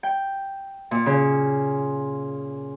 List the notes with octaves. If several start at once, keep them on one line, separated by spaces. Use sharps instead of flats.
G5
A#2
C#3